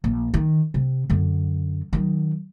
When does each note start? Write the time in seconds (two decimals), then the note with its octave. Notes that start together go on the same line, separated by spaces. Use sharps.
0.04 A#1
0.34 D#3
0.74 C3
1.10 F#2 D3
1.93 D#3 F#3